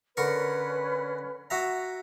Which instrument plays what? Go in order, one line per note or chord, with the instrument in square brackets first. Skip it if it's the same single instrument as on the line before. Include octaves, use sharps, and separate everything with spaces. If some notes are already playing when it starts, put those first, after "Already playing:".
[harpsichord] D3 A#4 C#6 [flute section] C#4 B4
[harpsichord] F#4 E5 A#5